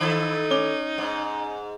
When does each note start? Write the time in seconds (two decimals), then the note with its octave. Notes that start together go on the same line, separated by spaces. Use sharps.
0.01 D#3 D#4 A4
0.50 C#4 D6 G7
0.98 G#2